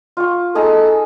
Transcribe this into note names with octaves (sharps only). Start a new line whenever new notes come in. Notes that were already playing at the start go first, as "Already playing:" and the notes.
F4 C#6
D#4 G#4 A4 A#5